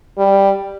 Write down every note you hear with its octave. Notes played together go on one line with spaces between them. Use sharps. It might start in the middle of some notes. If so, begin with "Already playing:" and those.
G3